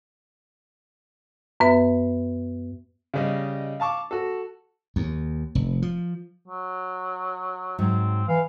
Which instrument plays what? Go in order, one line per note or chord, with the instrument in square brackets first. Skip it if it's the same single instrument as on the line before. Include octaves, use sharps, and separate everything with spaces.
[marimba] F#2 B3 B4 E5
[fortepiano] C#3 G3 D#5
F5 A5 C#6 D6
F#4 A4
[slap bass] D#2
F1
F3
[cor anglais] F#3
[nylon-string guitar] G#2 F#3 [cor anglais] C4
[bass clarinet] E3 [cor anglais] F5